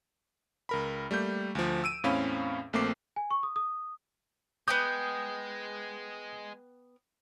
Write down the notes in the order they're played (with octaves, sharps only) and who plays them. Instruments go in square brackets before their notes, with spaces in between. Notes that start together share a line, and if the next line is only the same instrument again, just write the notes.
[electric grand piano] C#2 A#4 B5
G3 A3 A#3 G6
D2 F3
E6 D7 D#7
E2 A2 C4 C#4 F5 B5
A#1 A3 A#3 C4 D6 C7
[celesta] G#5
C#6
D#6
D#6
[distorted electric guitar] G#3 [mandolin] B3 G5 D#6 [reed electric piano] G6